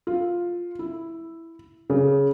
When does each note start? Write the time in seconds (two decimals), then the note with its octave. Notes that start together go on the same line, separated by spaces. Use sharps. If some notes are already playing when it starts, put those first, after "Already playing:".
0.07 F4
0.79 E4
1.90 C#3